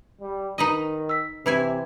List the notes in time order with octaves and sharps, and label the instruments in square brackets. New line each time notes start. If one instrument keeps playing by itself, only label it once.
[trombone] G3
[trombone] D#3 [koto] D#4 B4 D#5 [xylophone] D#7
[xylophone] E6 B6
[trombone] C3 [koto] E3 E4 G#5 [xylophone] B4 G#6